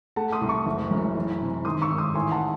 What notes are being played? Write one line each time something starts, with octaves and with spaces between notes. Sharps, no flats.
A3 F#5 A5
C6 D#6
C2
A5 C#6
F#1
F#2
E3
C3
D#3 C6 D#6
C#6 E6
G#1
C6 D#6
A1 G#5 C6
F#5 A5